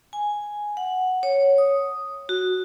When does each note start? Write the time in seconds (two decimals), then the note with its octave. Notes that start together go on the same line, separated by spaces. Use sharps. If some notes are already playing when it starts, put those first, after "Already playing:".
0.13 G#5
0.77 F#5
1.23 C#5
1.58 D#6
2.29 F#4